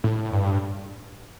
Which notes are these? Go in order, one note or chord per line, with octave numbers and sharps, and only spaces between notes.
A2
G2